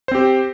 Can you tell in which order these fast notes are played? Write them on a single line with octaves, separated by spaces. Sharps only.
C5 C4 G4